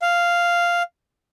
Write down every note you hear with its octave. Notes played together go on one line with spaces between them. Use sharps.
F5